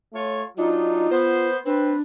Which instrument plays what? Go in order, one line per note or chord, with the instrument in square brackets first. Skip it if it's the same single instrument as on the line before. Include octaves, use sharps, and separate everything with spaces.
[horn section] A3 F4 C#5
[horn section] F#3 D4 D#4 [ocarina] F4
[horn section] B3 C5
[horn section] C4 B4 [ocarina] D4